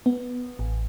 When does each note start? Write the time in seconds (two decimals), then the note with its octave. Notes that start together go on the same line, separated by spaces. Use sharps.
0.06 B3
0.59 A1